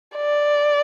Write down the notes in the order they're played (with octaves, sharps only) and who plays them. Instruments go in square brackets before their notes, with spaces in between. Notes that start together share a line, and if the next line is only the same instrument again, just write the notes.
[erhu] D5